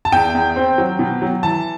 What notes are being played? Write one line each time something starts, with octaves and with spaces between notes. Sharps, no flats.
A5
E2 G5
E2
C4
F#3
B2
F#3
E3 A5